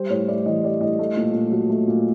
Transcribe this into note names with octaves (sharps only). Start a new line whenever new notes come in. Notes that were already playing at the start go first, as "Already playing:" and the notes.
Already playing: G3 C5
A2 C#5
A2 D5
E3 D#5
G3 D5
A2 D#5
A3
A#2
A#2
F#3
A3
A#2